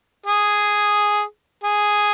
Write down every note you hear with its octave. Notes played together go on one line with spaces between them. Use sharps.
G#4
G#4